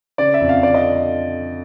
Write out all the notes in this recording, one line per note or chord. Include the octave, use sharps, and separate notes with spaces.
C#3 D5
E5
F2
F5
D3 D5
D#5